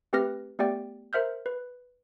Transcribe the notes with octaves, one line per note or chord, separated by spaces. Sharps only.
A3 C4 G4 B4 F6 A#6
A3 B3 G4 D5 G5 A6
A#4 C5 E5 F6 G6
B4